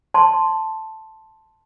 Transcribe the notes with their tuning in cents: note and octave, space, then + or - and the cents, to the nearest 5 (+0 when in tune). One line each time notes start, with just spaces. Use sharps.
A5 +0 C6 +0